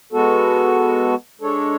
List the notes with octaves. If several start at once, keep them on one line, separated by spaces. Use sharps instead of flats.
G#3 B3 F#4 A4
G#3 D4 A4 C#5